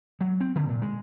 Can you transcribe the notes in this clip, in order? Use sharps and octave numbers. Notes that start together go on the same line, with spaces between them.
F#3
C4
D3
A#2
G#3